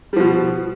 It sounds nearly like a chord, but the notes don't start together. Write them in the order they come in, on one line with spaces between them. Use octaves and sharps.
G3 F3 B2